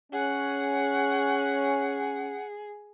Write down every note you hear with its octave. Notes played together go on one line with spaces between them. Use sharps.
C#4 G#4 F#5